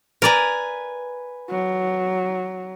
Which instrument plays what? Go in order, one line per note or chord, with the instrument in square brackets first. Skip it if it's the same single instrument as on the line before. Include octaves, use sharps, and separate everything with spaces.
[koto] A#4 D5 A#5 [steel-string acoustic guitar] B4 G#5
[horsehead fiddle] F#3